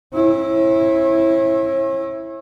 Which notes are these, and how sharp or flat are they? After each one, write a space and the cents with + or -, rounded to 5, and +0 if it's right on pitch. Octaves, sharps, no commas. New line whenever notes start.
C#4 -40 E4 +0